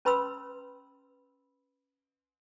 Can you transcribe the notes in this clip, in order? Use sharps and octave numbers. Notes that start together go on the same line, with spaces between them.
C#4 B4 B5 C6 E6